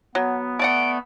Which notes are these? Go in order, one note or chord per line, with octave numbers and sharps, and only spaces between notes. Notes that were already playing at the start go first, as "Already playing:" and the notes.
F#3 B3
A3 D5 F#5 D7